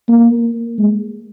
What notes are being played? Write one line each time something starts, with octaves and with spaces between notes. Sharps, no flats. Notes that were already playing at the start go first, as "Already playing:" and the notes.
A#3
G#3